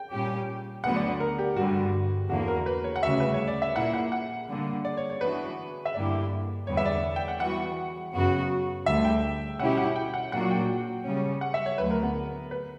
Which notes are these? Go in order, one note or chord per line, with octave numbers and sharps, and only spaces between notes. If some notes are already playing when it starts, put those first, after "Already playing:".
Already playing: G5
A#2 G3 C#4 G4
D2 D3 F#3 B3 F#4 F#5
D5
D5
A#4
G4
G2 D3 G3 F#4
E2 D3 A#3 F#4
A#4
B4
C#5
F#5
D2 C#3 G3 C#4 F#4 E5
B4
C#5
D5
E5
A#2 A#3 E4 F#5
F#5
F#5
D3 G3 A#3
D5
C#5
C#5
E3 B3 D4 F#4 B4
E5
G2 D3 A#3 E4 G4 D5
E2 D3 G3 B3 C#5
E5
D5
G5
F#5
E3 G3 B3 F#4 F#5
F#2 C#3 F#3 B3 F#4
D2 D3 G3 E5
G5
B2 G3 C#4 E4 G4 F#5
F#5
G5
F#5
A#2 F#3 A#3 D4 F#4 F#5
G5
C#3 G3 C#4
F#5
E5
C#5
D2 D3 F#3 B4
A#4
B3
B4